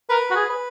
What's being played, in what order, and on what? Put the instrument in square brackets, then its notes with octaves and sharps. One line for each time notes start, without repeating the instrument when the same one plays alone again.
[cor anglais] A#4 [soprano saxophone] B4
[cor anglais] F#4
G#4
[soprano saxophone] B4